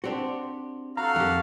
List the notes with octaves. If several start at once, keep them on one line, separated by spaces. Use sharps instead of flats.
C4 D4 F#4 G4 C5
F#4 A4 F5 A#5
F2 D#3 A#3 G4